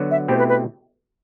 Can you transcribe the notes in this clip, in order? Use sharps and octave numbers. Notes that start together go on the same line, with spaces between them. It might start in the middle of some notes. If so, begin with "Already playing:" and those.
Already playing: D3 F#3 B3 F#4
E5
B2 A3 C4 E4 G4 C5
B4
B4